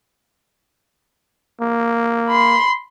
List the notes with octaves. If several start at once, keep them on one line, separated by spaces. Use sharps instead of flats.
A#3
B5 C6